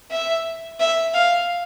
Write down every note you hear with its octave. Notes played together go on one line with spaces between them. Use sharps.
E5
E5
F5